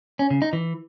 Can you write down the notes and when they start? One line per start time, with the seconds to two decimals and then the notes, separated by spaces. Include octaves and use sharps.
0.19 C#4
0.31 C#3
0.42 D#4
0.53 E3